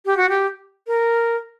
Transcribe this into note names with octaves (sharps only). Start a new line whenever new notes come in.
G4
F#4
G4
A#4